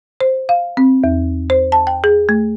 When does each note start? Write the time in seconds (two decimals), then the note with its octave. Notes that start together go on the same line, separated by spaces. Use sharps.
0.21 C5
0.49 F5
0.77 C4
1.04 E2
1.50 C5
1.72 A5
1.87 G5
2.04 G#4
2.29 A3